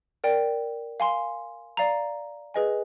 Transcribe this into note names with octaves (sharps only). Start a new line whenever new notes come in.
A#4 D5 G5
F5 G#5 C6
D5 F5 A#5
G#4 B4 D#5 G#5